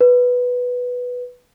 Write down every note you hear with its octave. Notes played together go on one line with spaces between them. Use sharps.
B4